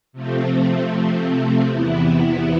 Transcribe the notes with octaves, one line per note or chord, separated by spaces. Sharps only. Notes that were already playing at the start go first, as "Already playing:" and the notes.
C3 F3 A3 C4
E2 C3 E3 B3 E4